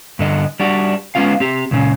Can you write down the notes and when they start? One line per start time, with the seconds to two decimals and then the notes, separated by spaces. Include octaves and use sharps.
0.19 G2 D3 D#5
0.60 G3 D4 F#4
1.15 G#3 B3 C#4 F4 F5
1.40 C4 G4
1.71 C#2 A#2 C#3